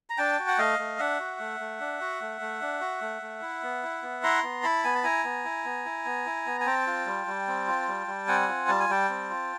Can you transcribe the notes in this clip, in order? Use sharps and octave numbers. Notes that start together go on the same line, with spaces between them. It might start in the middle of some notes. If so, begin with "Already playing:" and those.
A#5
D4 G5 A5
F#4
F#5
A3 D#5 F5
A3
D4 E5 F#5
F#4
A3
A3
D4
F#4
A3
A3
D4
F#4
A3
A3
E4
B3
E4
B3
E4 A#5 C6
B3
E4 A5 B5
B3 G#5
A5
E4 G#5 A#5
B3
E4
B3
E4
B3
E4
B3
G#5
C4 G5 A5
F4
G3
G3
C4
F4
G3
G3
C4 F#5 G#5
F4
G3 A5
G#5
G3 G5 A5
C4
F4